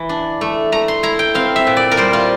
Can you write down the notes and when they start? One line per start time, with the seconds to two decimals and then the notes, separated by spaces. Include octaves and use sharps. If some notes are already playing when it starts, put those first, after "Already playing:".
Already playing: E3
0.09 D4
0.41 A3
0.72 A3 A#5
0.88 C6
1.03 E4 A#5
1.19 G5
1.35 C4 F5
1.56 E5
1.67 A#2
1.77 D5
1.91 A#4
1.97 G3 C5
2.13 F4